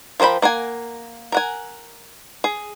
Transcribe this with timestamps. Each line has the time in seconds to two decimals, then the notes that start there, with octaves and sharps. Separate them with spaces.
0.20 F3 A#4 C5 G5 B5
0.42 A#3 A#4 F#5 G#5
1.32 A#4 F#5 G#5
2.44 G#4